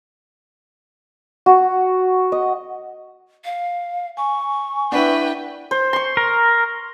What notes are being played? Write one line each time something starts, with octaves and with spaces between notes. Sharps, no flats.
F#4
D#5
F5
G#5 C#6
D4 E4 B4 F#5 G5
C5
C6 C#6
A#4